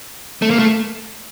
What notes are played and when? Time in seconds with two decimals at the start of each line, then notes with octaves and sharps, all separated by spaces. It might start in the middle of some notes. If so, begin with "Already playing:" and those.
0.42 A3
0.51 A#3
0.59 A3